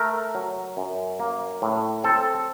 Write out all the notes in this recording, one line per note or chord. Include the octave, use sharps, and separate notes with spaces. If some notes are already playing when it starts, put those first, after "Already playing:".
Already playing: A3 A#4
F#3
F#2
A#3
A2
C4 A4